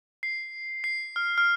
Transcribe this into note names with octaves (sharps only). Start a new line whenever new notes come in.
C7
C7
F6
F6